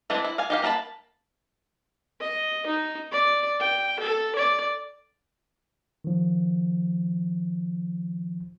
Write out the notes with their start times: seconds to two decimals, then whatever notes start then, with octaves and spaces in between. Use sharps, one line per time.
0.10 E3 G#3 C4 D4
0.24 E4
0.38 F5 G#5
0.50 D#4 G4 F5
0.62 A#3 A#4 B4 A5 B5
2.21 D#5
2.67 D#4
3.12 D5
3.60 G5
4.00 A4
4.36 D5
6.04 D#3 F3